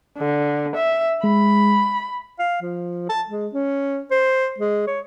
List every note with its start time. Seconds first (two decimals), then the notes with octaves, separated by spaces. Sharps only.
0.18 D3
0.76 E5
1.24 G#3 B5
2.39 F5
2.62 F3
3.09 A5
3.29 G#3
3.54 C#4
4.11 C5
4.58 G#3
4.87 C#5